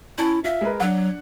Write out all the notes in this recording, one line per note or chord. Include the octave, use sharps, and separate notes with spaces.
C#4 E4 A5
F4 E5
G#3 A#4 B4
F#3 D4 F#5